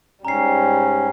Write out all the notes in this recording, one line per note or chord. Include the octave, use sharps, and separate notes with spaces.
G#2 G3 C#4 A#5 C7